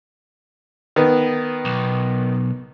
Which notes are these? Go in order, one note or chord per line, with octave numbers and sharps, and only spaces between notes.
D#3 B3
B1